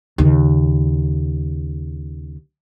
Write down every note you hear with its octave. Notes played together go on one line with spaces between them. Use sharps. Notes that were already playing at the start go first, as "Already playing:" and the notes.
D#2 C#3